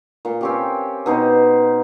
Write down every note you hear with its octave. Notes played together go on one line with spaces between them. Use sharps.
A#2
C4 C#4 G4
B2 D#4 C5